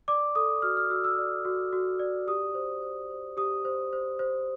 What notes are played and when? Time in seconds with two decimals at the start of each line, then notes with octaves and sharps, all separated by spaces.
0.08 D5 D6
0.35 A4 D#6
0.62 F#4 F6
0.77 F6
0.90 F#4 E6
1.04 E6
1.18 D5
1.45 F#4
1.73 F#4
1.99 D5
2.27 G4 D#6
2.54 C5
2.82 C5
3.10 C5
3.37 G4 D#6
3.65 C5
3.93 C5
4.19 C5